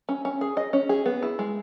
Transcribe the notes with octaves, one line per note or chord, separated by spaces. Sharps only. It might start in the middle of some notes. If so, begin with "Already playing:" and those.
C#4
C#4
G#4
D#5
C#4
G#4
B3
E4
G#3